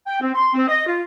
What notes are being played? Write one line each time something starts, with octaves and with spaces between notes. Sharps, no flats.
G5
C4
C6
C4
D#5
F4